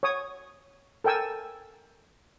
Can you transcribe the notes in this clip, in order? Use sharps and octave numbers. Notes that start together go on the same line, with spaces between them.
C#5 D#6
A4 A#4 G5 G#5 E6